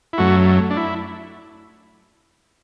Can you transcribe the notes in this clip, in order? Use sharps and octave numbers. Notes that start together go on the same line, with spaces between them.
E4
F#2 F#3 A3 F#4
D4
E4